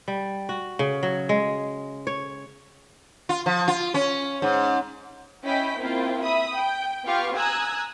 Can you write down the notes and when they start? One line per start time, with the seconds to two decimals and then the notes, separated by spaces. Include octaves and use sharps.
0.08 G3
0.49 F#4
0.79 C#3
1.03 F#3
1.29 G#3
2.07 C#5
3.29 F4
3.46 F3
3.68 F4
3.94 C#4
4.42 G#2
5.43 C#4 E4 D#5 G5 B5 B6
5.79 A#3 C4 E4 F4 G5
6.23 E5 B5 D#6
6.56 G5
7.06 B3 F4 G4 F5 C#6
7.36 G#5 A#5 D#6 E6 F#6 G#6